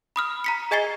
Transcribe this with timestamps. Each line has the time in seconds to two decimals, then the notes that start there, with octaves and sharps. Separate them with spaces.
0.16 B5 D#6 F6
0.44 A#5 B6 C#7
0.71 G#4 D#5 G#5 A6 C7 G7